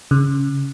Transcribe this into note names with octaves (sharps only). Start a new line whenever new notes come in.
C#3